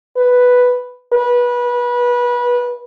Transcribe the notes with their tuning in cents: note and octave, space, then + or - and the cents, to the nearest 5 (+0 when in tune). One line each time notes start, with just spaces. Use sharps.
B4 +0
B4 -25